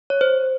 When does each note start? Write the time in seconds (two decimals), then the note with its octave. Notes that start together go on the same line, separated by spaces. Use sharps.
0.10 C#5
0.21 C5